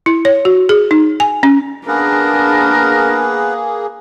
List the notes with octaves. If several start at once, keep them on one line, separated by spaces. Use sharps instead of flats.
E4
C#5
F#4
G#4
D#4
G#5
C#4
A#3 B3 D4 G#4 A#4 B4